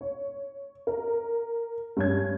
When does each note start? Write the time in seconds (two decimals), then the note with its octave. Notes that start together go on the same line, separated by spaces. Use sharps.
0.01 C#5
0.87 A#4
1.97 G2 C#4 G#6